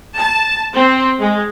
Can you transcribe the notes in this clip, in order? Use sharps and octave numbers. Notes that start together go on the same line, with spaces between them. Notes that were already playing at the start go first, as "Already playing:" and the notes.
A5
C4
G#3